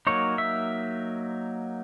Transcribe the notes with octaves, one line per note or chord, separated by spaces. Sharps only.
F#3 A#3 D#4 C#5
E5